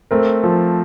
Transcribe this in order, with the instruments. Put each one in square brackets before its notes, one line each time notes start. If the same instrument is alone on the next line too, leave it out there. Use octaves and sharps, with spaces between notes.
[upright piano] A3 C4 [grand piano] A#4
[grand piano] F3